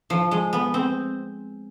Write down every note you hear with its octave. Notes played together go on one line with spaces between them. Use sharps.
F3
G#3
B3
C4